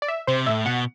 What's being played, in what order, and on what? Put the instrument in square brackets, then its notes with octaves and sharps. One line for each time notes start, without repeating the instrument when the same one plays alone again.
[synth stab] D5
E5
[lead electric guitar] C3 [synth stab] C5
[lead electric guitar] A2 [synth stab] E5
[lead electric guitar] B2 [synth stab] F#5